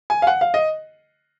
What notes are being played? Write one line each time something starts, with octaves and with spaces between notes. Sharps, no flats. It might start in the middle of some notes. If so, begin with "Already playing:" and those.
G#5
F5
F#5
F5
D#5